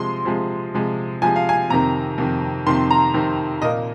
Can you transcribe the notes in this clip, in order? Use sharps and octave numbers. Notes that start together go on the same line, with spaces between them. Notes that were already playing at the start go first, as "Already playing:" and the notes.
Already playing: C3 F3 G#3 C6
C3 F3 G#3
C3 F3 G#3
C3 F3 G#3 G#5
F5
G#5
F2 C3 D#3 A#5
F2 C3 D#3
F2 C3 D#3 C6
A#5
F2 C3 D#3
A#2 A#3 D#5